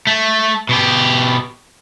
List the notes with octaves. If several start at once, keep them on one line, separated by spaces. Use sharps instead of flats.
A3
B2 G4